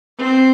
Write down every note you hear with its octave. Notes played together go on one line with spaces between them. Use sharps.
C4